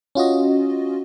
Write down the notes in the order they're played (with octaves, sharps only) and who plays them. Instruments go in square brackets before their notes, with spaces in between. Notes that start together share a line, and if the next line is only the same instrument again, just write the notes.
[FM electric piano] C#4 F4 F#4 D#5